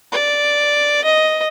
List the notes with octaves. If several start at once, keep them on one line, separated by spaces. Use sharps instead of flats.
D5
D#5